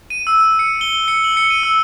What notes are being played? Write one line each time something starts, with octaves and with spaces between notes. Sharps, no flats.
D#7
E6
C#7
G7
C#7
F#7
C#7
D#7
E6